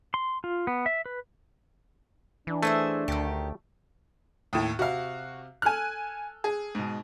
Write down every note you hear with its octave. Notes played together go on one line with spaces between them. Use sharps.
C6
F4
B3
E5
B4
E3 D4
A3 G#4 C5 E5
D2 D#3 G4
D#2 A2 D#6
C3 F#4 F5
A4 G#5 F6 F#6
G#4
G#2 B2